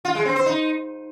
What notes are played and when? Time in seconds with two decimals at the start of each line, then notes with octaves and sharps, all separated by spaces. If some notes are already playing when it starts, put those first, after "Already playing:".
0.05 F4
0.15 G#3
0.25 C4
0.36 C5
0.46 D#4